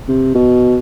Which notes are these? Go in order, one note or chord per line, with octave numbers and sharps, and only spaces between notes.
C3
B2